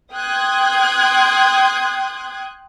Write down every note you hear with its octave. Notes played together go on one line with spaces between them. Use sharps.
G5 C6 D#6 F#6 G#6